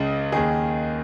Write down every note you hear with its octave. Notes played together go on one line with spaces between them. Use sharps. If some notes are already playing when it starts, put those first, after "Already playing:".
Already playing: C#2 C#3
D#2 D#3 G#4